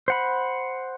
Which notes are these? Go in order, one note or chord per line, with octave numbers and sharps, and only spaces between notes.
C5 F#5 B5